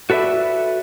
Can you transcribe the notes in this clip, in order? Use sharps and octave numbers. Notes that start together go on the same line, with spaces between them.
F#4 A4 B4 D5 E5